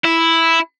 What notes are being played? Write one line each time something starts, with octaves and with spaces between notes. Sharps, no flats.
E4